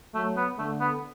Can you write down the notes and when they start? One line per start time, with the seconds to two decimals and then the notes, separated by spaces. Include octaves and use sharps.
0.15 F#3 A3
0.37 B3
0.58 D3 A3
0.81 B3